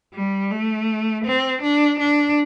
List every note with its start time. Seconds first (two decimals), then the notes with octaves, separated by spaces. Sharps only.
0.14 G3
0.51 A3
1.25 C4
1.62 D4
1.99 D4